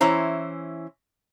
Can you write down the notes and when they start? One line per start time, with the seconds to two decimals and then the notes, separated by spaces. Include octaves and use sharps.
0.01 E3 C#4 E4 C5 A#5